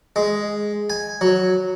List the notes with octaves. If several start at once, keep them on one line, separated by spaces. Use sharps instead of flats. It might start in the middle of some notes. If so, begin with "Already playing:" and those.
G#3
G#5
F#3